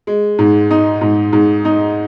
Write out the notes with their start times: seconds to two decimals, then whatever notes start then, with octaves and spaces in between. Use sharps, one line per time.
0.07 G#3
0.39 G#2
0.71 D#4
1.01 G#2
1.33 G#2
1.65 D#4